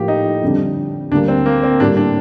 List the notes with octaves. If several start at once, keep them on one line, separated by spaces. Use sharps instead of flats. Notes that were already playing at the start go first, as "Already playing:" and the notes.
Already playing: A2 F3 A#3 F4 G4
D#4
F2 D3 G3 D4
D2 D3 G3 A#3 D4
C4
A#3
C4
A2 G3 A#3 D4
D4